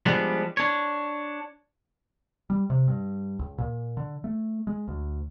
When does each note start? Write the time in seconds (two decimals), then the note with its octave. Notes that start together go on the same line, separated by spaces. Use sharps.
0.06 F3 G3 G#3 B3 D4
0.57 D4 C#5
2.50 G3
2.70 C3
2.88 G2
3.39 C#2
3.58 A#2
3.97 D3
4.24 A3
4.67 G#3
4.88 D2